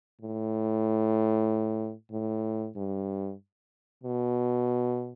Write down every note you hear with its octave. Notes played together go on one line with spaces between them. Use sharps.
A2
A2
G2
B2